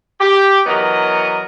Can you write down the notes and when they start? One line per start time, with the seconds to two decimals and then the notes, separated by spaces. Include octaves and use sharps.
0.20 G4
0.67 E3 F#3 B3 A#4 D#5